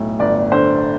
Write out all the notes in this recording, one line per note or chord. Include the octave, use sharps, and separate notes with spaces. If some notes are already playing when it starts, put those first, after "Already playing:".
Already playing: B1 A2
G1 D5
D3 C5